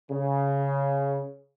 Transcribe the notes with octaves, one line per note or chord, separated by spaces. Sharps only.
C#3